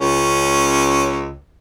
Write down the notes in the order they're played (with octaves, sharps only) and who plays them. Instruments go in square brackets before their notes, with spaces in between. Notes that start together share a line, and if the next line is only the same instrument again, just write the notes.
[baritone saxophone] C#2 [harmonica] C#4